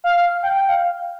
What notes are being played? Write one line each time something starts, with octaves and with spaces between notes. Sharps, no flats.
F5
G5
G5
F5